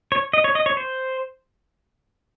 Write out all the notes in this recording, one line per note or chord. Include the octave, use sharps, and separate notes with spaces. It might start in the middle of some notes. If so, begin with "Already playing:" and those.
C#5
D#5
C#5
D#5
C#5
C5